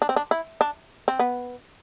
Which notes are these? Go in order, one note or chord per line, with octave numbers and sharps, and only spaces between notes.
D4
C4
D4
E4
D4
C4
B3